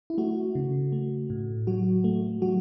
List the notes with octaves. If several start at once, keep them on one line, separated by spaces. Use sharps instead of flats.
E4
A3 F#4
C#3
A3
A2
F#3 F#4
A3
F#3 F#4